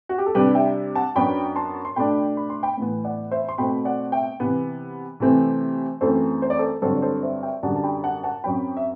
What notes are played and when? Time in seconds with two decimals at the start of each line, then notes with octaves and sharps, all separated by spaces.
0.09 F#4
0.18 G4
0.26 A4
0.35 C3 G3 D4 G4 B4
0.55 E5 G5
0.95 F#5 A5
1.16 F#2 F#3 B3 D4 G5 B5
1.56 A5 C6
1.85 C6
1.96 B2 A3 D4 G5 B5
2.37 B5
2.50 C6
2.63 G5 B5
2.77 A2 E3 B3
3.04 D5 F#5
3.31 C5 E5
3.49 C6
3.58 B2 A3 C4 G5 B5
3.85 D5 F#5
4.12 E5 G5
4.40 C3 E3 B3
5.20 C3 E3 A3 C4
6.01 F#2 E3 A3 C4 A4 C5
6.42 C5
6.50 D5
6.59 A4 C5
6.82 G2 D3 F#3 C4 A4 C5
7.02 A4 C5
7.23 C5 E5
7.43 E5 G5
7.63 F#2 D3 G3 F#5 A5
7.76 A5
7.84 G5 B5
8.03 F#5 A5
8.24 F#5 A5
8.44 F#2 F#3 C4 G5 B5
8.77 E5